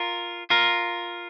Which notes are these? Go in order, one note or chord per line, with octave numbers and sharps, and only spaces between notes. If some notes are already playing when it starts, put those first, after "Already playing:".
Already playing: F4 A#4
F4 A#4